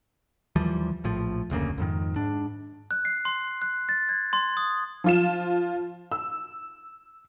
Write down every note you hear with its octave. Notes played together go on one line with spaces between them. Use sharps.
D#2 E3 F3 G3
A#1 A2 F3
F1 D2 C#3 A#3
F2 G#2 D#3
G#2 D4
F#6
C7
C6
F#6
A6
G#6
C6
D#6
F3 F4 E7
E6